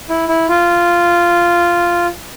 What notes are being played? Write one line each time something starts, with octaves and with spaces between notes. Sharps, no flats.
E4
E4
F4